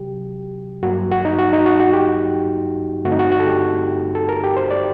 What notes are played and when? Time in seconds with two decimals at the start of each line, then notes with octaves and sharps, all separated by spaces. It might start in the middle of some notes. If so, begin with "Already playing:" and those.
Already playing: C3 F#3 G4
0.83 G2 F#3 A#3 F#4
1.11 F#4
1.25 D#4
1.39 F#4
1.53 D#4
1.66 F#4
1.80 F#4
1.93 G4
3.04 G2 D3 A3 C4 F#4
3.12 D#4
3.19 F#4
3.32 F#4
3.40 A4
3.46 G4
4.15 A4
4.29 A#4
4.44 G4
4.57 C5
4.71 D5